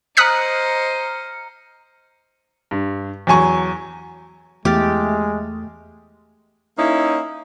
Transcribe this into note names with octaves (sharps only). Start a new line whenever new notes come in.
C5 D#5 A#5 D#6 F6 F#6 B6 C#7
G2
E2 F#3 G#5 C#6
E2 G#3 A3 G4 F6 A6
A#3 C#4 D#4 E4